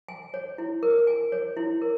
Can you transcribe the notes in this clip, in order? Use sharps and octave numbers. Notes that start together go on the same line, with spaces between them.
G#5
C#5
E4
A#4
G#5
C#5
E4
A#4